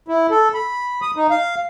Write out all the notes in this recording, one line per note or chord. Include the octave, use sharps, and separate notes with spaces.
E4
A4
B5
D#6
D#4
F5